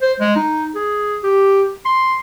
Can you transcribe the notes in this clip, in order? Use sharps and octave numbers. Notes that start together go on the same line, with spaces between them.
C5
G#3
D#4
G#4
G4
C6